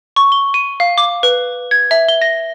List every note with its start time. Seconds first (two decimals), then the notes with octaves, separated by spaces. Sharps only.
0.16 C#6
0.32 G7
0.54 D#7
0.80 F5
0.98 D6
1.23 B4
1.71 G#6
1.91 E5
2.08 G7
2.21 A#6